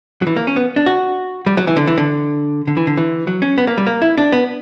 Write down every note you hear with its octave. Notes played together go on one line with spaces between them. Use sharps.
F#3
E3
A#3
C#4
B3
D4
F#4
G3
F#3
E3
D3
E3
D3
D3
E3
D3
E3
F#3
C#4
B3
A#3
G3
A#3
E4
D4
B3